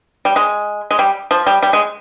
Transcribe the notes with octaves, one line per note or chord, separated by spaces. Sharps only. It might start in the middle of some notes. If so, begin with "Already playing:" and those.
G3
G#3
G#3
G3
F3
G3
G3
G#3